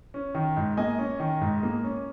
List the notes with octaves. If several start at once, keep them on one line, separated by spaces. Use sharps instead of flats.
C#4
D#3
G#2
A#3 D#5 G#5
C#4
D#3
G#2
A#3
C#4